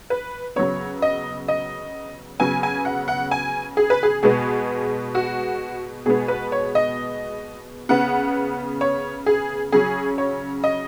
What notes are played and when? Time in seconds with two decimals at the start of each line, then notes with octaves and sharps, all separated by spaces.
0.10 B4
0.56 C#3 F#3 B3 C#5
1.02 D#5
1.48 D#5
2.40 C#3 F#3 B3 G#5
2.63 G#5
2.85 F#5
3.08 F#5
3.31 G#5
3.77 G#4
3.90 B4
4.03 G#4
4.23 B2 G#3 B3 G#4
5.15 F#4
6.05 B2 G#3 B3 G#4
6.28 B4
6.52 C#5
6.75 D#5
7.89 C#3 B3 F#5
8.81 C#5
9.26 G#4
9.72 C#3 F#3 C#4 G#4
10.18 C#5
10.64 D#5